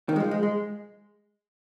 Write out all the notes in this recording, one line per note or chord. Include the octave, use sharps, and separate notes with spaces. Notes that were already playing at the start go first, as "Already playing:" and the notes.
D#3
G#3
F3
G#3
G#3